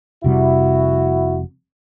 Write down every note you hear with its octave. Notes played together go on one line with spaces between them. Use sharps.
F1 C3 G3 E4 F#4